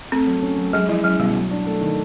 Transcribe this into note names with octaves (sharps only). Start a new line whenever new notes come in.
A3 C4
F#3
C#4
F#3
F#3 G#3
F3 E4
F#3 C#4
B2 G3
F#3
D4
A3
D#3